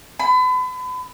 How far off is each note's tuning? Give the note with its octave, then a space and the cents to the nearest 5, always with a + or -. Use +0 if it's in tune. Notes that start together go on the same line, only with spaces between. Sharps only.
B5 +35